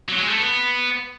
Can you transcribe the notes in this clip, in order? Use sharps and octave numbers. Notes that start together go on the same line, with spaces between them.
F#3
G#3
A3
B3